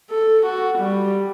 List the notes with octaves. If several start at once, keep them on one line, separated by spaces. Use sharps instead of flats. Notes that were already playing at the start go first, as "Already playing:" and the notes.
A4
F#4
G3